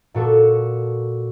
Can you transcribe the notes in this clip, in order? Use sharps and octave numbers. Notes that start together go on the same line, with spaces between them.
A#2 F#4 A4 C#6